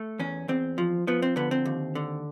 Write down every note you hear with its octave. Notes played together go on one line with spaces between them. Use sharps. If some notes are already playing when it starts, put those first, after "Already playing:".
Already playing: A3
E2 C#4
E2 C4
F3
F3 B3
C4
D3 B3
C4
D#2
D3